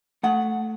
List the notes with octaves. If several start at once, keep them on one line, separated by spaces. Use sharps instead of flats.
A3 F#5